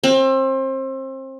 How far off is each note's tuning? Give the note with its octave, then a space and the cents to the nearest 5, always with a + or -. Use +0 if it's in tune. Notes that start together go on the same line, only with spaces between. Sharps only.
C4 +30